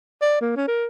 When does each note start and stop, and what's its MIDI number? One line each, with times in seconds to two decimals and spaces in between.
0.22 0.39 74
0.41 0.52 58
0.56 0.64 61
0.68 0.87 70